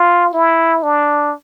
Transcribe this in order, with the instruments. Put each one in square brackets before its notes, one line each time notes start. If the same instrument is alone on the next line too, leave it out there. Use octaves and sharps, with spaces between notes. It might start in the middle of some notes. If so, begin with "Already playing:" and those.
Already playing: [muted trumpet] F4
E4
D4